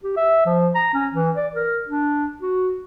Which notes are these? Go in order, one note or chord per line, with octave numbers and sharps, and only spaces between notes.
G4
E5
F3
A#5
C#4
E3
D5
A#4
D4
F#4